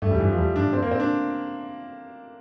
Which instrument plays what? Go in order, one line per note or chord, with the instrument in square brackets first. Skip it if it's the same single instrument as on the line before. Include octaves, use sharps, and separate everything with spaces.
[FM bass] G2 [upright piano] A3
[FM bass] E2 [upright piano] G3
[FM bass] A2
[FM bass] G2 [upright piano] E3
[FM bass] F2 [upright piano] F3
[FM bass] E2 [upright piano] G3
[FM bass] F2
[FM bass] G2 [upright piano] D4
[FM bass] A2
[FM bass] G2 [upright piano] C4
[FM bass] F2 [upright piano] A#3
[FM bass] A2 [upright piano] C4
[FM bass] A#2 [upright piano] D4